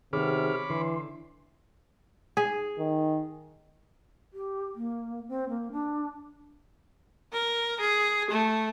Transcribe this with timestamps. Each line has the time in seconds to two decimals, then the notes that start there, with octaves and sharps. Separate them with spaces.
0.13 C3 D#3 B3 G#4 C#5 B5 D6 F6
0.70 D3 E3 C6
2.37 G#4
2.78 D#3
4.33 G4
4.75 A#3
5.28 C4
5.49 A#3
5.72 D4
7.33 A#4
7.81 G#4
8.30 A3